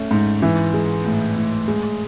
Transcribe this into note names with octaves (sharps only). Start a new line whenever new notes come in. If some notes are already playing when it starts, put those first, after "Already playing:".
Already playing: A3 C#4
G#2
E3
G#3
A2
A2
G#3